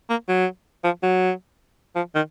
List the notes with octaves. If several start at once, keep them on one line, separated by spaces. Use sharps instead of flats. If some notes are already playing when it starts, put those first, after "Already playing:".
A#3
F#3
F3
F#3
F3
D#3